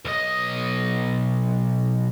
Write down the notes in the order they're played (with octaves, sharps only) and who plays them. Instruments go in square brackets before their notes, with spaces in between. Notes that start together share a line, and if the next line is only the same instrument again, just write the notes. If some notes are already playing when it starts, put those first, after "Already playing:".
[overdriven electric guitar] B1 D#5